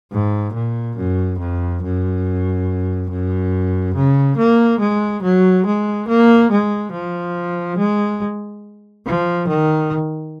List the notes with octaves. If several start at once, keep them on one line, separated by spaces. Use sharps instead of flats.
G#2
A#2
F#2
F2
F#2
F#2
C#3
A#3
G#3
F#3
G#3
A#3
G#3
F3
G#3
F3
D#3